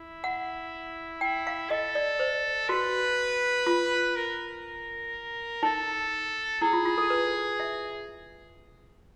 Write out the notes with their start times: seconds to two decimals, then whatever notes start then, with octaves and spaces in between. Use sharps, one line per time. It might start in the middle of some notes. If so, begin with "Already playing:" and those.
Already playing: E4
0.24 F#5
1.21 E4 G5
1.47 F5
1.70 A4 D#5
1.95 D5
2.19 C5
2.69 F#4 B4
3.67 F4
4.16 A#4
5.63 D#4 A4
6.62 E4 G#4
6.73 F4
6.86 F4
6.98 A4
7.10 B4
7.60 E5